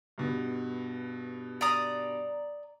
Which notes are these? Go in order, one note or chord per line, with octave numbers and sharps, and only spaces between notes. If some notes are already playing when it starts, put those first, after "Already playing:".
G2 B2
D5 A#5 D#6